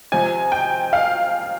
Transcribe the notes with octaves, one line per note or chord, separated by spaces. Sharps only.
C3 F3 G#5
G5
F5